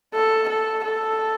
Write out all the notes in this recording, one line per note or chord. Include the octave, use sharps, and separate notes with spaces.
A4
A4
A4